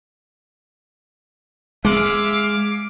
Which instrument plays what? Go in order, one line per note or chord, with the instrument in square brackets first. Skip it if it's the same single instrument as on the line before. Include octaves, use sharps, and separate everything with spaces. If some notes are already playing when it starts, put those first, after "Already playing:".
[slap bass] G#3 [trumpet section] E5 F5 [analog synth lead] D6